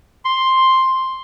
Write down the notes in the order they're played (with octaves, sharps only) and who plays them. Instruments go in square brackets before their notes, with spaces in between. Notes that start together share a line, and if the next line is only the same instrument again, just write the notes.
[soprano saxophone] C6